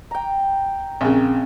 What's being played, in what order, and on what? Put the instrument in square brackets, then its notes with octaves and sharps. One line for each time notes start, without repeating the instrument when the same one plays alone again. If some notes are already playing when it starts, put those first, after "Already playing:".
[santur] G5 A#5
[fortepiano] A#1 C#3 [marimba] C4